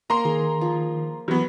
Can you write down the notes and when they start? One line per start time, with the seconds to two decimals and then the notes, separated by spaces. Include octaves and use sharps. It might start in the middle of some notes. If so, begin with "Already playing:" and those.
0.10 A#3 A#5 C6
0.25 D#3 G#4
0.61 F3
1.28 E3 F#3 B3